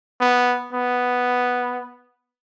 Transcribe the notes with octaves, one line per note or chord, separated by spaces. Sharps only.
B3
B3